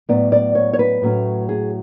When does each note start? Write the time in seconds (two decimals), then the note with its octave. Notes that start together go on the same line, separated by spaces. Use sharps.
0.09 A2 F#3 B3 D5
0.32 D5
0.55 C#5
0.73 C#5
0.79 B4
1.02 A2 F#3 A3 C#4
1.49 G#4